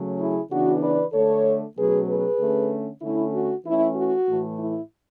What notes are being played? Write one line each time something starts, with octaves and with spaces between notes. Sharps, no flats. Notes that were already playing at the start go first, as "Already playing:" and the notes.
Already playing: C#3 F#3 A3 C#4
E4 G#4
C#3 E3 B3 D4 F#4
B4 D5
D3 A3 D4 A4 C#5
B2 F#3 A3 C#4 G#4 B4
G#4 B4
D3 A3 C#4
D3 A3 C#4 E4
F#4
E3 A3 C#4 E4
F#4
A2 E3 A3
E4